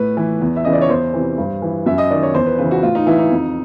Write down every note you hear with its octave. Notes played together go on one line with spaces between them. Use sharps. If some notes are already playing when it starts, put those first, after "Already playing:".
Already playing: A2 B4
E3
E2
E5
C#3 E3 D#5
D5
C#5
E2 C5
C3 E3
G2
E3
F#2 E5
D#5
D#3 D5
C#5
E2 C5
B4
C#3 E3 B4
F#4
A2 F4
D#4
E3 E4
D#4
F2